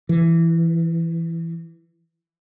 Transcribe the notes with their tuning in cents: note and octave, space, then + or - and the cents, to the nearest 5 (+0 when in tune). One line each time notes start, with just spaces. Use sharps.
E3 +10